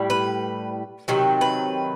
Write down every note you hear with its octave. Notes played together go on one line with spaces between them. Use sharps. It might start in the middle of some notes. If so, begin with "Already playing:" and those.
Already playing: A2 G3
B4
C3 D#3 F#3
B4